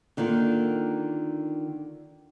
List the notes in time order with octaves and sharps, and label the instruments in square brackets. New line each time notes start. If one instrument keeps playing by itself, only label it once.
[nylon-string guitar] D3 D#3 A#3 F4